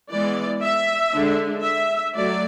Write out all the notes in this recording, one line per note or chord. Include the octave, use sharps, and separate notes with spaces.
E3 G#3 B3 D5
E5
D3 G#3 D4
E5
F#3 A3 D5